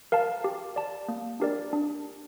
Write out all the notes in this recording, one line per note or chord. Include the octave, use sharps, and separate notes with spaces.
A#4 F5 A5
G4
D5 A5
A#3
D4 G4 A#4 D5
D4